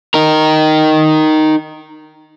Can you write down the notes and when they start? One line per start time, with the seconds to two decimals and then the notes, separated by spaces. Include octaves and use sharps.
0.14 D#4 A#4